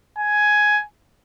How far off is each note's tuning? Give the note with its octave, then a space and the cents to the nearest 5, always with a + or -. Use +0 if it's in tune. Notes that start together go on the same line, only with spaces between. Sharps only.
G#5 +10